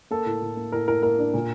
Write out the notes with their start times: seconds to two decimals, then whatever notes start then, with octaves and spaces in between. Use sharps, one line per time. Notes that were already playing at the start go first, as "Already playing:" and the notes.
0.11 A#3 A4
0.26 A2
0.42 A2
0.56 A#3
0.72 A2 A#4
0.88 A2 A#4
1.03 A#3 A#4
1.19 D4
1.34 A#2